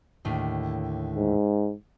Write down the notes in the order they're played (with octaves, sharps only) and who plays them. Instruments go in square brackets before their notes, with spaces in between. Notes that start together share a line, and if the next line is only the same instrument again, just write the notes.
[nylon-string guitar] D#2 A2 D3
[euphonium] G#2